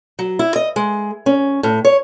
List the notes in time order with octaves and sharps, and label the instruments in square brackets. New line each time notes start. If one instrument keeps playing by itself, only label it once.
[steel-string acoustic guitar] F#3
E4
D#5
G#3
C#4
A2
C#5